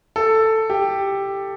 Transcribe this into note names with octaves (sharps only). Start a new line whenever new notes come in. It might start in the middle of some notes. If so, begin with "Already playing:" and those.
A4
G4